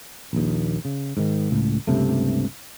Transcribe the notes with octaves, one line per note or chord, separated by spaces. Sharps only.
A#1 D#2
C#3
G#2 D#3
C#2 A2
C#2 G2 C3 A3